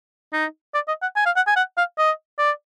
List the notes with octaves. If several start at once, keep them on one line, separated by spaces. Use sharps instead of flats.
D#4
D5
D#5
F#5
G#5
F5
F#5
G#5
F#5
F5
D#5
D5